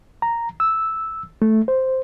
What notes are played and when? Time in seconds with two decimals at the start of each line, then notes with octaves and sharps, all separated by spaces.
0.22 A#5
0.60 E6
1.42 A3
1.68 C5